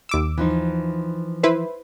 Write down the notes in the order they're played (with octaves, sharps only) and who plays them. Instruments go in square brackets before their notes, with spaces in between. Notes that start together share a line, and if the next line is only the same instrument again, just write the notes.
[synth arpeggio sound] D#2 D6 E6
[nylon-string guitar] E3 F3 D#4
[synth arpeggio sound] E4 B4 C5